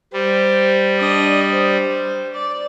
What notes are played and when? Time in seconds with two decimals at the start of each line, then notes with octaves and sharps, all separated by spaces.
0.13 G3 C5
0.99 D4 D#5
1.52 C5
2.34 D5